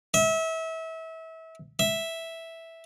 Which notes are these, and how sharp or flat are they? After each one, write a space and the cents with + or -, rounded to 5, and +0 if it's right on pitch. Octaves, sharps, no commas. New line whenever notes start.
E5 -30
E5 -5